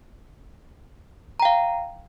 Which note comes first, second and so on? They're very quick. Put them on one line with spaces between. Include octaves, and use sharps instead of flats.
A#5 G5 F5